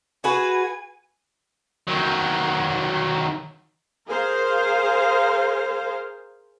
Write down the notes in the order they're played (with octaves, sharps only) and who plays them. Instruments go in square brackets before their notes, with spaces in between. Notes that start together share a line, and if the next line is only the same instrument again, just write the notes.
[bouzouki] F#4 G#4 B4 [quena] G#5
[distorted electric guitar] D#3 F#3
[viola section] G#4 A#4 C5 F5